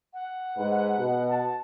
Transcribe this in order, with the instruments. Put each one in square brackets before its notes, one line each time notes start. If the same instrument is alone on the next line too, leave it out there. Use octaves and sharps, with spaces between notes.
[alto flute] F#5
[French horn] G#2 [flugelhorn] B4
[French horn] B2
[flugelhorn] A5